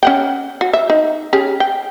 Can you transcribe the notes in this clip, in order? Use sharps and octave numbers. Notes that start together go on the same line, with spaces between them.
C#4 F#5 G5
F#4
E5
D#4
C#4 G4 G#4
G5